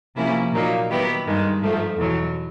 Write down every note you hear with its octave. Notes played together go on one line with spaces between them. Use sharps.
C3 F3 A#3 C#4 E4
A#2 F#3 A#3 D#4
D#3 F#3 B3 E4 G4
G2 D#3 G#3
G#2 F3 A3
E2 B2 F#3